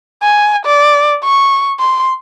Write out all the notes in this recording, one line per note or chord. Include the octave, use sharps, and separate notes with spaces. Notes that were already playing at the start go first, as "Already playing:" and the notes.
G#5
D5
C#6
C6